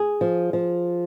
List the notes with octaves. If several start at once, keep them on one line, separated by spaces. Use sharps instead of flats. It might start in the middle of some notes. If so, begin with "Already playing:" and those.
Already playing: G#4
F3
F3